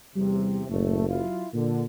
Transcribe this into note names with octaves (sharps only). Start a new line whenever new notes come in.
E2 C3 G3
F#1 A2 A3
F#3 E4 F4
A#2 D3